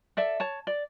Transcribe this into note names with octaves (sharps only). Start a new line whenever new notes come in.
A4 D5 E5
C#5 A5
D5